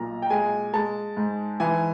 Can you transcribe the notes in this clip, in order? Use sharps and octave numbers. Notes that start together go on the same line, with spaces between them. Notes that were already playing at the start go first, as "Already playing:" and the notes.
Already playing: B1 A#2 A#5
G5
G#3 G#5
G#3 A5
G#2
E3 G#5